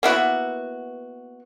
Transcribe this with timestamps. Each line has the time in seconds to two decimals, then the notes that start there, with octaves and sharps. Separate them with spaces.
0.03 A#3 B3 E4 F#4